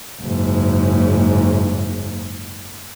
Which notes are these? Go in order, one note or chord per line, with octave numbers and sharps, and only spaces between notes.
F#1 G#2